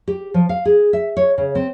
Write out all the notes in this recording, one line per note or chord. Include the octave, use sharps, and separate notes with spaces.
G4
F3
F5
G#4
E5
C#5
C#3
C4